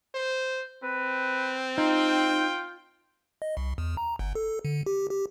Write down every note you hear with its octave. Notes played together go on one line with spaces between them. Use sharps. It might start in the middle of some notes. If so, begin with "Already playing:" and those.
C5
C4 B4
D#4 F4 G5
D#5
C2
E2
A#5
G1
A4
D3
G4
G4